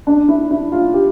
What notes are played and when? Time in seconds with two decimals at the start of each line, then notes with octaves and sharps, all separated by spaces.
0.07 D4
0.28 E4
0.51 E4
0.72 F4
0.94 G4